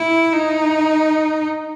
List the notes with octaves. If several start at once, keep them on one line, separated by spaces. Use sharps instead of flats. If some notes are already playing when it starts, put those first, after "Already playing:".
Already playing: E4
D#4